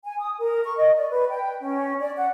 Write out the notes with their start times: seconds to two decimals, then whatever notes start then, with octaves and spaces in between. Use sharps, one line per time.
0.04 G#5
0.19 D#6
0.38 A#4
0.64 C#6
0.77 D#5
0.97 D5
1.10 B4
1.30 G5
1.60 C#4
2.01 D5
2.17 F#5